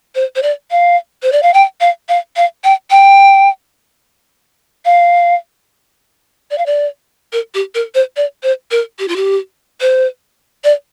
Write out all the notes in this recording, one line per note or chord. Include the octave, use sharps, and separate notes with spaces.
C5
C5
D5
F5
C5
D5
F5
G5
F5
F5
F5
G5
G5
F5
D5
F5
D5
A#4
G4
A#4
C5
D5
C5
A#4
G4
F4
G4
C5
D5